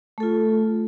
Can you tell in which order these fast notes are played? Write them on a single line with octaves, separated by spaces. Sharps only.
A3 A4 F4